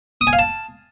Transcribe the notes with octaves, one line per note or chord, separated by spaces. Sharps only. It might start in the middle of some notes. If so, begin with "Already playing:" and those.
D#6
G#5
F5
A5